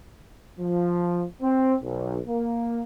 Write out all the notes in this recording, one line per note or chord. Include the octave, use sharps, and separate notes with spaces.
F3
C4
B1
A#3